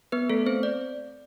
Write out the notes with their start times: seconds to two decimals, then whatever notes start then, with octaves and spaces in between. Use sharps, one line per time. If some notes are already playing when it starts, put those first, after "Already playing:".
0.12 B3 B4
0.29 A3 A4
0.46 C4 C5
0.63 D5